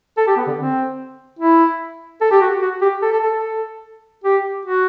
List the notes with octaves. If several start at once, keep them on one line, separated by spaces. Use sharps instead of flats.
A4
G4
B3
D3
C4
E4
A4
G4
F#4
F#4
G4
A4
A4
A4
A4
G4
F#4